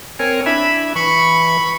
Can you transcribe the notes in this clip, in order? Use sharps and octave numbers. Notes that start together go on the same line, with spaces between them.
C4 A#4 C#5 G#5
D4 E4 E5 B5
E3 B5 C#6